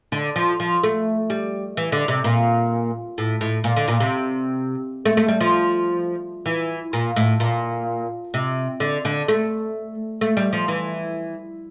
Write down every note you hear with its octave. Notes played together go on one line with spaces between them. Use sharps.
D3
F3
F3
A3
G3
E3
D3
C3
A#2
A2
A2
A#2
D3
A#2
C3
A3
A3
G3
F3
E3
A#2
A2
A#2
C3
D3
D3
A3
A3
G3
F3
E3